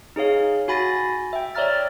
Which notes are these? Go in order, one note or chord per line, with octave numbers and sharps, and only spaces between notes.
D#4 G#4 C#5 F5
F#4 G#5 B5 A6 A#6
E5 G5
C#5 D5 E5 A#5 F6 A6